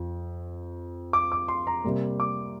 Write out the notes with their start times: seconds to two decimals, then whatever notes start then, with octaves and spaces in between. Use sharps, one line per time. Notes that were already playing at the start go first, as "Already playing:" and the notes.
Already playing: F2 F3
1.13 D6
1.32 D6
1.48 C6
1.67 A#5
1.84 C3 G3 A#3
2.20 D6